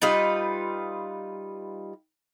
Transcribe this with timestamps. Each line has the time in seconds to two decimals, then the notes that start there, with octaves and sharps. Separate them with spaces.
0.02 G3 D#4 F4 B4